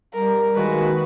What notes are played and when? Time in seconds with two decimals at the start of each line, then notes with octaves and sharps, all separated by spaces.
0.14 G3 A#4
0.55 D#3 G#3 A#3 F#4 B4